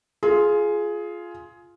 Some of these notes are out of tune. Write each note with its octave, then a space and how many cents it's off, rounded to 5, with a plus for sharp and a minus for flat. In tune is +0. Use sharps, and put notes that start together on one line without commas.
F4 -5 G#4 +15